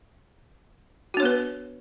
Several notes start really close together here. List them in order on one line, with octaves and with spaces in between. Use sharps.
F#4 D4 C#5 B3 B4